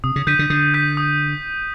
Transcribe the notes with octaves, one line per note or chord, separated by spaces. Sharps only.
C3 D#6
C#3
D3 G6 B6 D#7
D3
D3 D#6
G6 B6 D#7
D#6